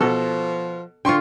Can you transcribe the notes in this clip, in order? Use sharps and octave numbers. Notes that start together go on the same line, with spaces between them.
B2 F3 A4
D3 F4 G5 C6 C#6